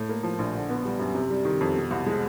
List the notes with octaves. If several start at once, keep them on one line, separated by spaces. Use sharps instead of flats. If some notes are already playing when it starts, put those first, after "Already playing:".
Already playing: A2
A#3
F3
A#1
D3
B3
G3
F#2
C3
G3
D#3
F2
B2
C2
G#3